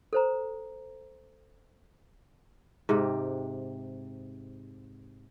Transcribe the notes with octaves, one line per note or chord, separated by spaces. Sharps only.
A4 C5 A#5
G#2 C3 G4